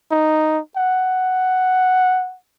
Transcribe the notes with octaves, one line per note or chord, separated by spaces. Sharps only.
D#4
F#5